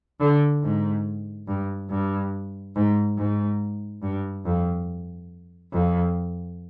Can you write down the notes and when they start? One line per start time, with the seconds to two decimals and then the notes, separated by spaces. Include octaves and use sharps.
0.20 D3
0.63 G#2
1.47 G2
1.90 G2
2.76 G#2
3.18 G#2
4.03 G2
4.45 F2
5.72 F2